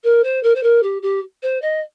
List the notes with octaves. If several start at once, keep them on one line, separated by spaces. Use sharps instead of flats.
A#4
C5
A#4
C5
A#4
G4
G4
C5
D#5